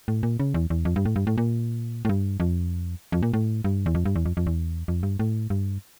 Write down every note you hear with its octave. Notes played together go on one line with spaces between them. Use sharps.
A2
A#2
C#3
E2
E2
F2
G2
A2
G2
A2
A#2
A2
G2
F2
F2
A#2
A2
G2
E2
F2
G2
E2
F2
F2
E2
F2
G2
A2
G2